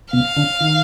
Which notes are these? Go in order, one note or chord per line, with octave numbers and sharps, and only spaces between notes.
B2 B3 F5
D3 D4
D#3 D#4